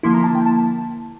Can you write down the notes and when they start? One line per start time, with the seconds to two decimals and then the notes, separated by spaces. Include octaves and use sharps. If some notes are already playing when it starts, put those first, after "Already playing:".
0.03 D3 F3 A#3 E4 C6
0.14 A#5
0.24 A5
0.35 G5
0.45 A5